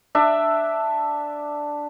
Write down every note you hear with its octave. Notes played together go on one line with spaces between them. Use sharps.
D4 E5